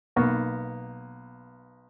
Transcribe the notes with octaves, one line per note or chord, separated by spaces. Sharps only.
B1 A#3 B3 C#6